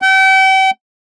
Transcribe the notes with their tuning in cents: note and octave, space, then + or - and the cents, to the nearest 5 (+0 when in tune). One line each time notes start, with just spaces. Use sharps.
G5 -40